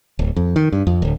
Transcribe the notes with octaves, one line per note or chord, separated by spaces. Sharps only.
D1
F2
D#3
G2
F2
D1